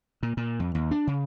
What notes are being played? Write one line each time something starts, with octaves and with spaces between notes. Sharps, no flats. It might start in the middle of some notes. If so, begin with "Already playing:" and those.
A#2
A#2
F2
D#2
D4
C#3